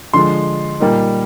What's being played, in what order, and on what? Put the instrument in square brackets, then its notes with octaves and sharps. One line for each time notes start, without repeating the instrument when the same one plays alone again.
[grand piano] D3 F3 G#3 C6
A#2 G3 A#3 D#4